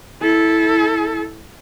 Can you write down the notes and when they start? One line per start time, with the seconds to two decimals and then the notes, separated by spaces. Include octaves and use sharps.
0.22 E4 A4